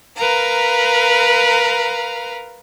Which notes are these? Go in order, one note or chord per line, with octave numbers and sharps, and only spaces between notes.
A#4 B4 F5 A#5